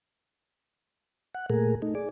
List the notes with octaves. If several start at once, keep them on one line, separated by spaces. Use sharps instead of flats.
F#5
A#2 A3 G#4 A#4
A3 D#4
G#4 D5